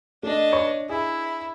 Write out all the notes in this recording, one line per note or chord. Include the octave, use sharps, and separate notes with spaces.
A3 D4 D#5
C#5 C#6
E4 G#4